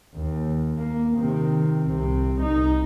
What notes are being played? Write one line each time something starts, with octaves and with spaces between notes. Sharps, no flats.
D#2
A#3
C3 D#3
C2 C3
C2 D#4